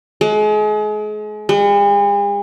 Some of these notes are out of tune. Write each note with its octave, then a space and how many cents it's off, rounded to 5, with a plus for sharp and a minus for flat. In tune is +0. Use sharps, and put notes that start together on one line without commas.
G#3 +35
G#3 -45